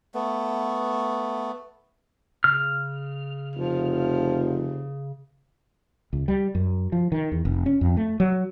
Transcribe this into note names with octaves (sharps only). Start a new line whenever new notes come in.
A3 B3
C#3 F6
F1 F3
C#2
G3
F#2
F3
D#3
E2
F1
C#4
F2
A3
F#3